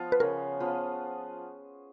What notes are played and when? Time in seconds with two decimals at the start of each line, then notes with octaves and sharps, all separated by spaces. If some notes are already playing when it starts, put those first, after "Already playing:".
Already playing: F3 B3 F4
0.12 B4
0.20 C#3 A#4
0.60 F3 B3 F4